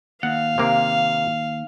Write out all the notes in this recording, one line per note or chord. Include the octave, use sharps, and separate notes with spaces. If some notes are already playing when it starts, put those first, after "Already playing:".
D#2 F5 F#5
C3 A#3